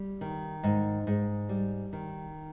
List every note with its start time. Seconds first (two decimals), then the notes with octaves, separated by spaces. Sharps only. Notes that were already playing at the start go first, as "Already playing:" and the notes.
Already playing: G3
0.21 D#3
0.63 G#2
1.07 G#2
1.49 G3
1.93 D#3